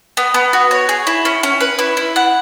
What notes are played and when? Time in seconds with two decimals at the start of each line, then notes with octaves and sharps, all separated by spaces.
0.17 B3
0.34 B3
0.53 F#4
0.71 C#5
0.89 G#4
1.07 E4
1.25 C#4
1.43 C#4
1.60 B4
1.79 E4
1.97 E4
2.16 F#5